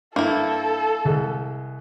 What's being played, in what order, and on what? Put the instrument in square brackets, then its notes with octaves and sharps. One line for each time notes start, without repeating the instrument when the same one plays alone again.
[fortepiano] G2 [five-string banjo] A#3 E4 [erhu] A4
[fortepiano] C2 G#3